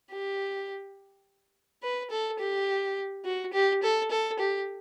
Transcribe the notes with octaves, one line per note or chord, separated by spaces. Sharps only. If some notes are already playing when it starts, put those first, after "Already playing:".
G4
B4
A4
G4
F#4
G4
A4
A4
G4